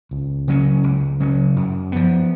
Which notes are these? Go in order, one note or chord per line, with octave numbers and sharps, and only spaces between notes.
C#2
C#3 F#3 C#4
C#2
C#3 F#3 C#4
F#2
F3 B3